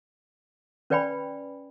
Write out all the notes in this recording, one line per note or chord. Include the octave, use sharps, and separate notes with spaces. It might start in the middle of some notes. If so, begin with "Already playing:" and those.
C#4 B4 D5 G5 G#5 B5